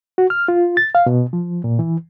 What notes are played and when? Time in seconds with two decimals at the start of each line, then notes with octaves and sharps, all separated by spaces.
0.18 F#4
0.30 F6
0.48 F4
0.77 A6
0.95 F5
1.06 B2
1.33 F3
1.64 A#2
1.79 E3